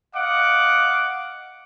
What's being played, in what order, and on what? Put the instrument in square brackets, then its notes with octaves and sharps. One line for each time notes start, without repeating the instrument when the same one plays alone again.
[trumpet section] D#5 F5 F#5 D6